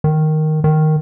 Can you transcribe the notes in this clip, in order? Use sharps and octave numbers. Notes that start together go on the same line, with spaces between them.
D#3
D#3